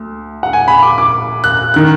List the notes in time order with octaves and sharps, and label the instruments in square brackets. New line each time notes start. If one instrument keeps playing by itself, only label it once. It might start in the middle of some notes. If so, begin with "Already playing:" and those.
Already playing: [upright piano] D2
F#5
G#5
B5
D6
D6
F#6
D#3 F#6